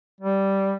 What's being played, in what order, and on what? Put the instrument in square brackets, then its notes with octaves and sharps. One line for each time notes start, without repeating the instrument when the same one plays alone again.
[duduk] G3